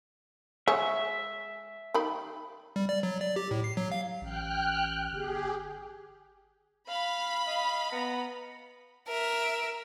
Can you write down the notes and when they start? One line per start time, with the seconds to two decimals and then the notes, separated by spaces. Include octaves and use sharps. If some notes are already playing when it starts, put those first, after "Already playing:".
0.68 G#3 C#5 E5
1.94 D#3 G4 B5
2.76 G3
2.89 D5
3.03 F#3
3.21 D5
3.36 G4
3.51 A2
3.64 C7
3.77 F#3
3.92 F5
4.21 A1 G5 F6 F#6
5.12 G1 G4 G#4
6.89 F5 B5
7.47 D#5 F5
7.92 B3 A#5
9.08 A#4 E5